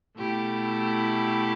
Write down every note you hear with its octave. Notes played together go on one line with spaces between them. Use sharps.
B2 A3 E4 G4